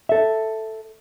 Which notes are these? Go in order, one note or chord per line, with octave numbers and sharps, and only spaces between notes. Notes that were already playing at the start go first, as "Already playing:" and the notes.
A4 E5